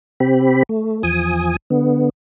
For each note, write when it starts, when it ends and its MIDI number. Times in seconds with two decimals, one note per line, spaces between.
0.20 0.63 48
0.20 0.63 60
0.20 0.63 67
0.20 0.63 83
0.69 1.03 57
1.03 1.56 40
1.03 1.56 53
1.03 1.56 80
1.03 1.56 87
1.70 2.09 50
1.70 2.09 59